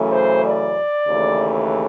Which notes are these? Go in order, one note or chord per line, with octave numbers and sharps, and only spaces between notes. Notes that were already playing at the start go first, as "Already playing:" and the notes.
Already playing: F#2 C#3 E3 A3
C5
D5
D#2 C#3 E3 A3